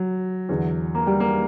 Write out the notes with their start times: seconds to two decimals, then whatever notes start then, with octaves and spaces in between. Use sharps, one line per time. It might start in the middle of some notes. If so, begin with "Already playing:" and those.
Already playing: F#3
0.49 E2 D3
0.95 A#3
1.07 G3
1.20 A#3